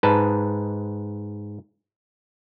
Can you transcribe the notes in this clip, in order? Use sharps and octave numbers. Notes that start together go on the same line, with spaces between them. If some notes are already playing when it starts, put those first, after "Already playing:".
G#2 B4 A5